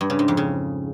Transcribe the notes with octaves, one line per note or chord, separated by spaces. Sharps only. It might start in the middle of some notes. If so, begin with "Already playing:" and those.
G2
C#3
G#2
F2
C#3